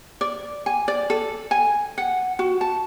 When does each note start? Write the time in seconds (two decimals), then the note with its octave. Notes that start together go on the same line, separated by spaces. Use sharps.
0.21 D5
0.66 G#5
0.88 D5
1.10 A4
1.51 G#5
1.98 F#5
2.39 F#4
2.61 A5